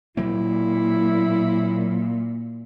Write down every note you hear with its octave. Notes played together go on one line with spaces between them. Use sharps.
A#2 F#3 A#3 C4 E4